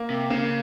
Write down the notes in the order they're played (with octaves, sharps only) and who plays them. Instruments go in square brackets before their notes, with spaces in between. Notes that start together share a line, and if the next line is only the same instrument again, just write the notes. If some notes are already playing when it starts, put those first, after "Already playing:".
Already playing: [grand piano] A#3
[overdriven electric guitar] C3
[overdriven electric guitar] C#3 [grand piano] A#3